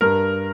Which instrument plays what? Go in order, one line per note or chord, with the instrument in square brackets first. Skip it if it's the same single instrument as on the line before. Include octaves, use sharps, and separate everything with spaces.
[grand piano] G2 A#4